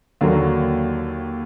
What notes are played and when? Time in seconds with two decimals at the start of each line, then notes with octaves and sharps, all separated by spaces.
0.21 D#2 D3 F#3 A#3